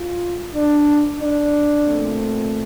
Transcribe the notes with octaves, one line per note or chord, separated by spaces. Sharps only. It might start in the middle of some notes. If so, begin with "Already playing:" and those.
Already playing: F4
D4
D4
A#2 A3 C4